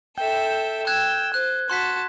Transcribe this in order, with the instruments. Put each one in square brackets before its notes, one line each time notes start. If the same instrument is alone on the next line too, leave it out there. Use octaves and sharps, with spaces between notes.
[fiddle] A4 E5 [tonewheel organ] G5
[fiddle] E6 [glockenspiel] F#6 G#6
[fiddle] C5 [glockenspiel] F#6
[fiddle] F#4 A5 [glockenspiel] C6 F#6 B6